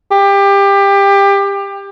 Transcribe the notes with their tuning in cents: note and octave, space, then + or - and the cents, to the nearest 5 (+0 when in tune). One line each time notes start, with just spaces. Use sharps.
G4 +25